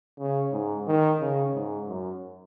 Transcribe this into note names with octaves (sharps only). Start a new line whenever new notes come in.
C#3
G#2
D#3
C#3
G#2
F#2